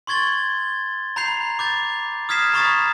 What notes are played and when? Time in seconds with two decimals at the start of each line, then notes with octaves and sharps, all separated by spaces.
0.07 C6 C#6 G#6 A6 G7
1.16 A#5 B5 G6 C7 F7
1.59 D6 G6 A6
2.29 D#6 F6 G#6 B6 C7 E7
2.53 A#5 B5 C#6 D#6 A6